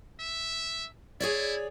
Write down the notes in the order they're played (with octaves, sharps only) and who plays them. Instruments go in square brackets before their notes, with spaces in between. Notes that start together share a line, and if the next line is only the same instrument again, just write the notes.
[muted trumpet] E5
[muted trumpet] E4 [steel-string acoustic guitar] G#4 C#5 D5